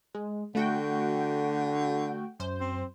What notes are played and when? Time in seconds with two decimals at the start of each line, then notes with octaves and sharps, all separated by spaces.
0.15 G#3
0.55 D3 A3 F#4 G5
2.40 F#2 C5
2.60 C4